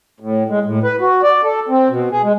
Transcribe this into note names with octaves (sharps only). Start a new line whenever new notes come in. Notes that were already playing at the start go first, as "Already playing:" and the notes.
A2
G#3
A2
B4
F#4
D5
A4
C4
B2
G#4
G#3